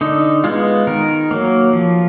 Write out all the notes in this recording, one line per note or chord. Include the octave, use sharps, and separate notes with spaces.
D3 D#4
G#3 B3 F4
D#3 A#4
F#3 A#3
F3